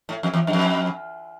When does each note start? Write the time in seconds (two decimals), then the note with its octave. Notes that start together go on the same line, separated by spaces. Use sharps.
0.09 A2
0.23 F2
0.34 E2
0.47 F#2
0.53 F2